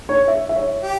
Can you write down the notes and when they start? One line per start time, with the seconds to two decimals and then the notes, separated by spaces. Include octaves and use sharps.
0.09 C#5
0.28 E5
0.49 E5
0.56 C#5
0.83 G4